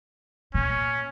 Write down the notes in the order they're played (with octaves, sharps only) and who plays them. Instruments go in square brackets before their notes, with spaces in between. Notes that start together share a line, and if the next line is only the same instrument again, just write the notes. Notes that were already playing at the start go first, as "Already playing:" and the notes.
[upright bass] A#2 [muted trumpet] C#4